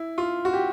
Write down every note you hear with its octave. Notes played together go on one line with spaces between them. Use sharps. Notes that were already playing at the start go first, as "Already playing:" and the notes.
Already playing: E4
F4
F#4
G4